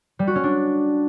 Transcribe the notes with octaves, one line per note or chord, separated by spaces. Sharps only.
G3
F#4
C#4
D4